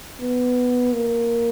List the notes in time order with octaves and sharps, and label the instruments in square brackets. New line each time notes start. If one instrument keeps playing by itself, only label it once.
[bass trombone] B3
A#3